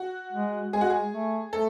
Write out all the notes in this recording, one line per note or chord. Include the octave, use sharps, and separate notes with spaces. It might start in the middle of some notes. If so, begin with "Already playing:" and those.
Already playing: F#4
G#3
G#3 G#4
F#4
G#4
A3
A3 A4